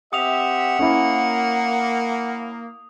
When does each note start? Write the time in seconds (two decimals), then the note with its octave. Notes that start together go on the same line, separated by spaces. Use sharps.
0.13 C4 G4 E5 F#5 D#6 F7
0.79 A#3 C#4 E4